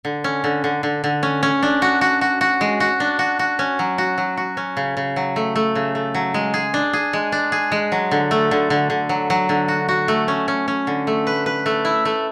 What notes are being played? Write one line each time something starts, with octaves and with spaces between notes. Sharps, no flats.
D3
C#4
D3
D3
D3
D3
C#4
C#4
D4
F#4
F#4
F#4
F#4
G#3
F#4
D4
F#4
F#4
C#4
F#3
F#4
F#3
F#4
C#4
C#3
C#3
F#3
A3
A3
C#3
A3
F#3
G#3
G#4
D4
G#4
G#3
D4
G#4
G#3
F#3
D3
A3
D3
D3
D3
F#3
F#3
D3
F#4
F#4
A3
C#4
C#4
C#4
D3
A3
B4
B4
A3
E4
A3